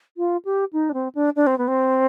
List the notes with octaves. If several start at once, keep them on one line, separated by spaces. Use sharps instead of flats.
F4
G4
D#4
D4
C4
D4
D4
C4
B3
C4